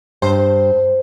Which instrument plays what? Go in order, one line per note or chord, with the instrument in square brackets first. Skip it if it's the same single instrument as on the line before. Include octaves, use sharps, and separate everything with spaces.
[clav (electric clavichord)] G2 [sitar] C5